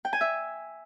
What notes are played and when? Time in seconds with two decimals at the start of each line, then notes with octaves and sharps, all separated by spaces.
0.05 G5
0.13 G#5
0.21 E5